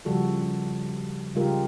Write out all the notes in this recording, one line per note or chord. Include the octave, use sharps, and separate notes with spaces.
C#3 F3 G3 F#4 A4
C#3 G3 G#3 F4 G4 A#4